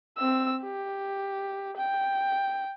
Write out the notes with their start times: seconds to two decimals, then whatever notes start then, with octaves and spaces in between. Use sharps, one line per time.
0.18 C4 E6
0.62 G4
1.76 G5